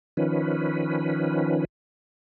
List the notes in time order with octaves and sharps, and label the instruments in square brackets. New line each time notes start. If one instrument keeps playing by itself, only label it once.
[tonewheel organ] D#3 F3 C#4 B4